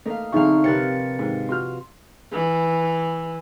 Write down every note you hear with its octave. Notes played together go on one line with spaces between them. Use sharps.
A3 A#3 D#4 F5
B1 D3 C4 D#4 G#4 E5 F5 C#6
C3 F3 A#4 B4 C#5 A6 C#7
G#2 D#3 G#4
F4 F#4 C6 F6
E3